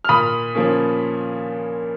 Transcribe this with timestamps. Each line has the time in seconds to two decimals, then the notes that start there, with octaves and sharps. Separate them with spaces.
0.05 F6
0.09 A#2 B5 D#6
0.55 F3 A#3 C#4